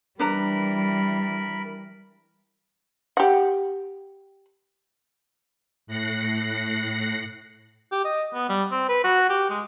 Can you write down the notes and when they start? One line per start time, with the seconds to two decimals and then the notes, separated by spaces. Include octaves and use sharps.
0.19 E3 G3 D4 A#4 B4 A#5 B5
3.17 G4 F#5
5.87 A2 F#6 A#6 C7 C#7
7.92 G4
8.05 D#5
8.34 B3
8.49 G3
8.72 C4
8.89 B4
9.04 F#4
9.29 G4
9.50 G#3